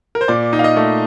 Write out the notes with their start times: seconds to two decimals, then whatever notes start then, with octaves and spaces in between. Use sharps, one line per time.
0.15 A#4
0.21 C5
0.28 A#2 D5
0.53 D#4
0.59 F5
0.64 D#5
0.77 A3